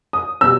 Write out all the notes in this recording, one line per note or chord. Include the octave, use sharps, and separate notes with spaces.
D#6
B2 G3 E6